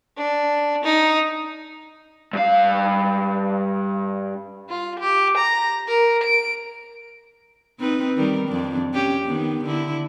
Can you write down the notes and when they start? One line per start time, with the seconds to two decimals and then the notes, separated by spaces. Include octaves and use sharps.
0.17 D4
0.84 D#4
2.33 G2 F5
4.69 F4
5.00 G4
5.38 A#5
5.88 A#4
6.24 D7
7.80 C4 D#4 B4
8.17 D#3 G3 A#4
8.49 F2 D4
8.94 C#4 G4
9.25 D#3 B3
9.64 D3 E4